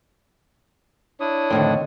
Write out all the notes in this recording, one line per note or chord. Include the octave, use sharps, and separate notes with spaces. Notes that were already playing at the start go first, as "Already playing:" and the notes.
D4 E4 C#5 D#6
F2 A2 D3 D#3 C4